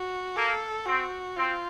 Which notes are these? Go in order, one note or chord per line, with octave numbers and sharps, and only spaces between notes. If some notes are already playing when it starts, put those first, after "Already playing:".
Already playing: F#4
A#3 A4
C4 F#4
C4 F4